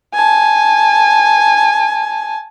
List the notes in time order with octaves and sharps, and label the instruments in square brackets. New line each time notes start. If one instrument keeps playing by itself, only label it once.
[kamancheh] G#5 A5